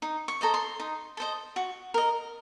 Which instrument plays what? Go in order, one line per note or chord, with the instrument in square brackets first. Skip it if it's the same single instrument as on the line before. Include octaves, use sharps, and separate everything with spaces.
[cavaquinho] D#4
C#6
A4 C5 D#5 A#5
C6
D#4
A4 C5 D#5
F#4
A#4 D#5